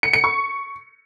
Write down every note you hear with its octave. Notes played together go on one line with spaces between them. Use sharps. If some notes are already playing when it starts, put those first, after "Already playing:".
C#7
C#7
C#6